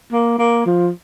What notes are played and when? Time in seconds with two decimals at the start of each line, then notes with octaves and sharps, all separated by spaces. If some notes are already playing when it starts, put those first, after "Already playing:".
0.13 A#3
0.38 A#3
0.66 F3